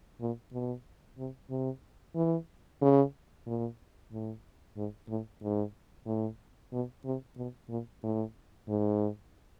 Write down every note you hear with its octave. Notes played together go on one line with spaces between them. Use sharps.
A#2
B2
C3
C3
E3
C#3
A#2
A2
G#2
A2
G#2
A2
B2
C3
B2
A#2
A2
G#2